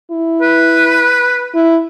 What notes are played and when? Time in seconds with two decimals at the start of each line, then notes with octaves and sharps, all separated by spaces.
0.11 E4
0.42 B4
1.54 E4